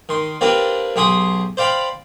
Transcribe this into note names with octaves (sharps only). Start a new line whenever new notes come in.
D#3 C6
A#3 C4 D4 F4 G4 B4
B1 G4 G#4 C6 D#6
C5 D5 F5 G5 B5